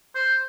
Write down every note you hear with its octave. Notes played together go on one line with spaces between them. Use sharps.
C5